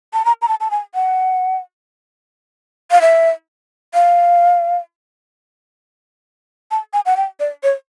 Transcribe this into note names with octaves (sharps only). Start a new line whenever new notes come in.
A5
A#5
A#5
A5
A5
G#5
F#5
F5
E5
F5
A5
G#5
F#5
G5
D5
C#5